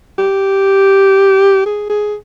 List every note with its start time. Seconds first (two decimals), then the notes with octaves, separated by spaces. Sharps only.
0.18 G4
1.66 G#4
1.89 G#4